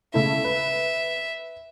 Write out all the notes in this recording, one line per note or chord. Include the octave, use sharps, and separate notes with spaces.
C#3 A3 E4 E5
B4